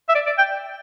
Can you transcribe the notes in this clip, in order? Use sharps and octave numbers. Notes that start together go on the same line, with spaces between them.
E5
D5
D5
G5